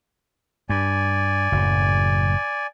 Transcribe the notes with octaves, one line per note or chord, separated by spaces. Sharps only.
G2 D5 G#5
F#1 F#2 A2